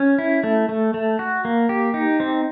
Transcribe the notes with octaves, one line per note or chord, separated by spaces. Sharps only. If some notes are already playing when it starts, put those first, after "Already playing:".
Already playing: C#4
E4
A3
A3
A3
F#4
A#3
G4
D#4
C4